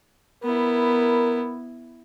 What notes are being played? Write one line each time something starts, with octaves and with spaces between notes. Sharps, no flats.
B3 E4 A#4